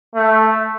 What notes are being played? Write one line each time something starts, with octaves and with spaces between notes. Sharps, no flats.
A3